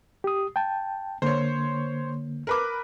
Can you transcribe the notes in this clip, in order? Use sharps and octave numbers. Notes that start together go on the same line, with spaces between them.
G4 D#6
G5 A5
D3 A#3 C5 C#5
A#4 B4 D6